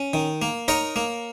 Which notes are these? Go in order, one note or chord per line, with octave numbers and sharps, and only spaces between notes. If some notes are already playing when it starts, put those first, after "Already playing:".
Already playing: C#4
D#3
A#3
D#4 A#4 C#5
A#3